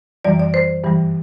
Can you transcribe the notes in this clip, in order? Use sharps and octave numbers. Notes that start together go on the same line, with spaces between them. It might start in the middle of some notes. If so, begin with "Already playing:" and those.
F#2 E3 G3 D5
D5
C5
G2 E3 G3